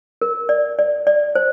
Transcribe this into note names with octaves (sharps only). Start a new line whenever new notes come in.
A#4
D5
D5
D5
C5